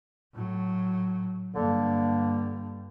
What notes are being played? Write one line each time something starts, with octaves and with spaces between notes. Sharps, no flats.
A2 F#3
G2 D3 A#3